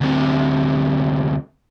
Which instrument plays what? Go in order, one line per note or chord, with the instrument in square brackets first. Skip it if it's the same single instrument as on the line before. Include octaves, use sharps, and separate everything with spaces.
[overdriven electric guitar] D2 C3